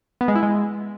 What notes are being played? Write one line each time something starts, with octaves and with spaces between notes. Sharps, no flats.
B3
G#3
E4
G#3